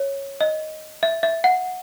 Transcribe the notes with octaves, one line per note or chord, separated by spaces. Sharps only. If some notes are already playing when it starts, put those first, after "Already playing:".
Already playing: C#5
D#5
E5
E5
F#5